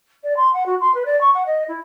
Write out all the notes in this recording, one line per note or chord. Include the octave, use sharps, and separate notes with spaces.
D5
C6
F#5
F#4
C6
B4
D5
C#6
F#5
D#5
E4